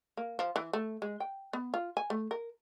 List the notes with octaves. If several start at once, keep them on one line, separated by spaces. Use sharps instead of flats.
A#3
F3
E3
A3
G#3
G5
B3
F4
G#5
A3
A#4